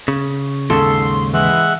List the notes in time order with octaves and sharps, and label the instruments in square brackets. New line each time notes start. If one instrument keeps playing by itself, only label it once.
[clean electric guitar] C#3
[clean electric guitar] D#2 G#2 C#3 [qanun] A4 [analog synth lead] C6
[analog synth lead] E3 [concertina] G#3 E5 F#5